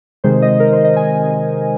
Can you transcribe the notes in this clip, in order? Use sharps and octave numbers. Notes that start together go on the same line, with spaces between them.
C3 D#3 G#3 C5
D#5
A#4
C5
D#5
G#5